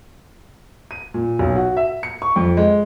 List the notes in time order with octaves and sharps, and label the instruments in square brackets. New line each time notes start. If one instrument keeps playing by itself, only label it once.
[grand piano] D#7
A#2
B1
F#4
E5
C#7
C#6
F2
G#3